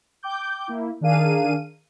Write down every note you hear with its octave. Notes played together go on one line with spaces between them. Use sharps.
G5 D6 G6
A#3 E4
D#3 D4 G#4 A#4 F5 D#7